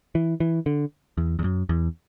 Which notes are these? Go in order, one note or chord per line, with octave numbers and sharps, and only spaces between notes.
E3
E3
D3
E2
E2
F#2
E2